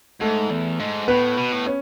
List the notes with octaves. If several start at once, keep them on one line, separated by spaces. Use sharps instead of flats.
G#2 A3 A4
E2
G#2
A2 B3 B4
B2
A2
C#4